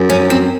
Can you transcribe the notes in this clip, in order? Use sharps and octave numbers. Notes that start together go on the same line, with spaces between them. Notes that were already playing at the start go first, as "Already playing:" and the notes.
Already playing: F#2
C#4
C4